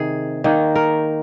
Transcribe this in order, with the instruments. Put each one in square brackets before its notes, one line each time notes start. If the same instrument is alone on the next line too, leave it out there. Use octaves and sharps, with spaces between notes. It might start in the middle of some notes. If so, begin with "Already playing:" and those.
Already playing: [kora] C3 D#3 G#4
D#3 A#3 D#4
A#4